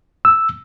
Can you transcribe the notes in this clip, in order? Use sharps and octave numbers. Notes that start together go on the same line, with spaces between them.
E6